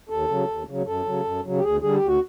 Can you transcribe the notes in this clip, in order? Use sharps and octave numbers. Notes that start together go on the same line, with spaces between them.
D#2 A4
C#3 F#3
D#2
C#3 F#3
F#2 A4
C#3 F#3
F#2
C#3 F#3
G4
D2 G#4
D3 G3 G#4
G4
D2
F#4